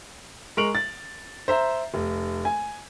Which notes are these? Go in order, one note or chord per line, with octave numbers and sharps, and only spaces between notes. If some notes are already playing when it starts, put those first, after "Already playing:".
G#3 A#4 C#6 D7 F7 F#7
A6
C5 E5 A#5
F1
G#5